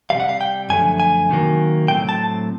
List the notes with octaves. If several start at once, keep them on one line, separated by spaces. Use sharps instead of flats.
C3 D#3 G3 F5 F#5
F5
G5
F#2 D3 F3 A3 G#5
G#5
C3 D#3 F#3 A#3
A2 F#3 A3 C4 G5
A5